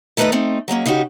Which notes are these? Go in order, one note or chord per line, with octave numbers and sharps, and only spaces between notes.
D#3 A3 D#4 B4 D5 D#5
A3 C4 D#4
F#3 G#3 A#3 C#4
C#3 D#4 F#4 G4